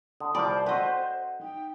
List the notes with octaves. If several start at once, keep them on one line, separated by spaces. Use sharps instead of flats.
D3 D#6
C2 F3 G3 C5 D5 A5
C4 F#4 A4 B4 D#5 F#5
D#4 G5